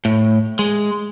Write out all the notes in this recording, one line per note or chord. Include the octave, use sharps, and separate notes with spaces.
A2
G#3